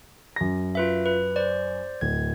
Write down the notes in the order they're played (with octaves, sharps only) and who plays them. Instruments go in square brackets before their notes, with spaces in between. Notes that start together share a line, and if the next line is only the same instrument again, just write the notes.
[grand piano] F#2 A#6
[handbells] F4 B4 E5
B4
C5 D5
[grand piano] D1 [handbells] G#6